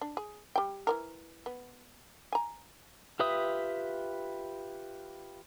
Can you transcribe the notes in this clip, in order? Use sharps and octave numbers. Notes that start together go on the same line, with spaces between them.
D4
G#4
G3 G5
E3 B3 A#4
B3
G#5 A#5
F4 G4 B4 E5 D#6